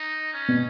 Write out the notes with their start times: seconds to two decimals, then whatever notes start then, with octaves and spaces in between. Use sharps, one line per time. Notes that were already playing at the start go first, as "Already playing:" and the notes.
Already playing: D#4
0.33 C#4
0.48 B2